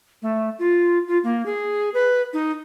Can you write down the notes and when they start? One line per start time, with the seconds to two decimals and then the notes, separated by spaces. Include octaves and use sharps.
0.22 A3
0.59 F4
1.08 F4
1.24 A#3
1.46 G#4
1.94 B4
2.33 D#4